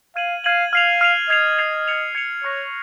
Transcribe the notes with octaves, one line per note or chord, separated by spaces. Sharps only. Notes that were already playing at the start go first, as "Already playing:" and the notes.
F5 F6 G#6 D#7 F#7
F5 F6 G#6 D#7 F#7
F5 F6 C7 F7
F6 C7 F7
D#5 G#6 C7 F7
G#6 C7 F7
G#6 C#7 F7
G#6 C#7 F7
C#5 C#6 F#6 A#6 C#7